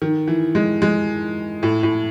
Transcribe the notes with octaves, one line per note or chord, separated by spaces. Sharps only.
D#3
E3
G#3
G#3
A2
A2